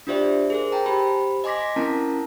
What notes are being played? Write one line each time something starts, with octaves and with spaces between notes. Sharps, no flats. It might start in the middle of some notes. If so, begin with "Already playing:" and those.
D4 F4 G4 C5 D5 E5
G#4 A#4 C5
G5 A5 A#5
G4 C5 B5
D#5 G#5 C6 D6 A#6 B6
C4 C#4 E4 A#4 A5 A#5